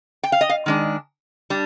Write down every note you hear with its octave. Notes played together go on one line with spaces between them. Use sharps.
G5
F5
D#5
F5
D#3 G#3 D4
G3 D4